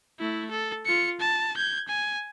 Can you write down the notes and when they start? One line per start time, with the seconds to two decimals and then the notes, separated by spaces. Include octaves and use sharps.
0.19 A3 E4
0.51 A4
0.85 F4 C#7
1.20 A5
1.57 G6 G#6
1.88 G#5